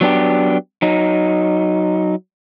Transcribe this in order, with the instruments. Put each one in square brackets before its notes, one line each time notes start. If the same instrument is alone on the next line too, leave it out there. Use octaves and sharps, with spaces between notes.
[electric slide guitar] F#3 B3 D4 G4
F#3 D#4